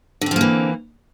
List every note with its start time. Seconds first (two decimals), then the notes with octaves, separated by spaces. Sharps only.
0.21 D3
0.26 C4
0.31 F3
0.36 A#3
0.41 E3